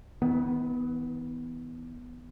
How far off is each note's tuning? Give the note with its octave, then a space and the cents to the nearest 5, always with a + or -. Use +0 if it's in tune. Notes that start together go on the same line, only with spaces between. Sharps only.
D#3 +45 B3 +0